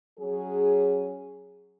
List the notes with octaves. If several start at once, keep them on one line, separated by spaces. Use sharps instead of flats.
F#3 C#4 G#4